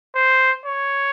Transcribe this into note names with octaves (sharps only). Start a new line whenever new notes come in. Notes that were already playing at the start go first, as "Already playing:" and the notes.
C5
C#5